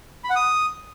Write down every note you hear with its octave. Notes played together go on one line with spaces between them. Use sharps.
B5
F#5
D#6